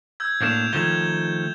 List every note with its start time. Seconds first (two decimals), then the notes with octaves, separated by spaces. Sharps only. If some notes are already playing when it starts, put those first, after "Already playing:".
0.20 E6 G6 G#6
0.42 A2 A#3 D4 G6 E7 F7
0.73 D#3 F3 A3 G#6 E7 G7